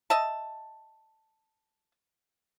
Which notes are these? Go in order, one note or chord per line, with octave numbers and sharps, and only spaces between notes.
D#5 E5 A5